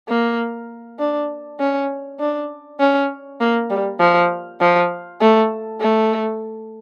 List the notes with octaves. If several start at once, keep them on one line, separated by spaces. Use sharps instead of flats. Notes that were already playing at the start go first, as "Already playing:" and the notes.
A#3
D4
C#4
D4
C#4
A#3
G3
F3
F3
A3
A3